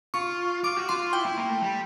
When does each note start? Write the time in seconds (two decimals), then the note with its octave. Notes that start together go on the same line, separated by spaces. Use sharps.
0.14 F4 C#6
0.63 F4 D6
0.77 F#4
0.89 F4 C6
1.13 E4 G5
1.26 E4
1.37 A#3
1.49 A3
1.62 G3